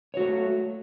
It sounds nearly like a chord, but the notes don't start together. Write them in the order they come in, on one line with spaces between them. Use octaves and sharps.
C#5 F#4 A3